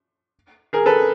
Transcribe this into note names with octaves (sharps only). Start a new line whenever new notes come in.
G#4 A#4
A4 B4